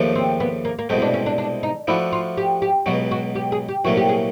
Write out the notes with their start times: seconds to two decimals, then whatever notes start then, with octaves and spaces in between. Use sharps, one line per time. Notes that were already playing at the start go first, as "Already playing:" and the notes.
Already playing: D#2 C#3 F3 A3 D4
0.15 C4
0.40 B3
0.65 A#3
0.79 A#3
0.89 C2 B2 G#3 A3 C4
1.02 D4
1.14 C#4
1.26 D4
1.38 D4
1.63 D#4
1.88 F3 A3 D4 E4 F#4
2.12 F4
2.37 G4
2.62 G4
2.86 C#2 B2 F#3 F#4
3.11 F#4
3.35 G4
3.52 G#4
3.68 G4
3.84 C2 A#2 F#3 A3 C#4 F#4
3.97 G4
4.09 G#4